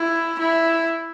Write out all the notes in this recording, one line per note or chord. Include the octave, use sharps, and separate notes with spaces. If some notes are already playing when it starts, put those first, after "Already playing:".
Already playing: E4
E4